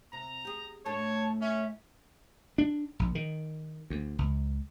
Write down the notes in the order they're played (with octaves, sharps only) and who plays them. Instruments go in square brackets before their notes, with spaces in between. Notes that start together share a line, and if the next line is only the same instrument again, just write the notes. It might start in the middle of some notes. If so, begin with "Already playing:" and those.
[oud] C3 [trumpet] A#5
[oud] G4 G#4
[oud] A2 A3 D4 [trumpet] C#5 [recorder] A5
[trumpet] C#4 [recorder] E5
[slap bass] D4
A#1
D#3
D2
C#2